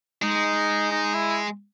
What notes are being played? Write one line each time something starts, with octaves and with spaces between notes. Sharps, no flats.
G#3 D#4
D#4
E4